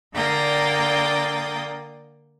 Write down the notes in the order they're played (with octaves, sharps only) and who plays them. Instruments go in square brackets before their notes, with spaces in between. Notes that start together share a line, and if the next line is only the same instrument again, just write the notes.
[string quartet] D3 A#3 D5 G5 D#6